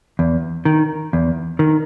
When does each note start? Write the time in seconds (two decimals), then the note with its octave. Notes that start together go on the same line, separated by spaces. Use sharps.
0.19 E2
0.65 D#3
1.13 E2
1.59 D#3